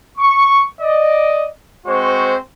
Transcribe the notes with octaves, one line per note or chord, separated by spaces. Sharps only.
C#6
D5 D#5
G#3 C4 F#4 C5 C#6